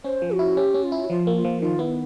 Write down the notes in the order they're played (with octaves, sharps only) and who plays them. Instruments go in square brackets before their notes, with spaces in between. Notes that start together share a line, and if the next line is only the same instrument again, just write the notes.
[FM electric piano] C#4 [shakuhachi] C5
[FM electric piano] F3
[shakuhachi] F#4
[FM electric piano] E4
[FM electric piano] C#4 [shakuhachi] G4
[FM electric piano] C#4
[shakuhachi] F4
[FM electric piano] E4
[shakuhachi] F#4
[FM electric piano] F3 [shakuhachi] F4
[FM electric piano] A#3
[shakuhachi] F4
[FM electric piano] F3
[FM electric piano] D#3 [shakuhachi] F4
[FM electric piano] B3 [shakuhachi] E4